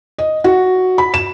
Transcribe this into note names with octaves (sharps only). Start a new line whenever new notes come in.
D#5
F#4
B5
E7